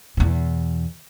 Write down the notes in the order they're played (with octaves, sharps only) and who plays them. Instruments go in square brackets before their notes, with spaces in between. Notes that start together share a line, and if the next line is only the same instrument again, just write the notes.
[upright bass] E2 B2